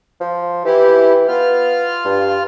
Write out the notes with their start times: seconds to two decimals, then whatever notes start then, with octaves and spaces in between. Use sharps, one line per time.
0.20 F3
0.65 E3 E4 G4
1.28 B3 F4 F6
2.05 G2